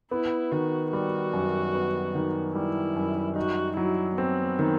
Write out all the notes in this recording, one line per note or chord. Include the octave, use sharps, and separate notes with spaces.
B3 E4
D#3 F#4
G3 F#4
F#2
B3
D#3
G3 E4
F#2
D#4 F#4
F#3 E4
B3 C4
D#3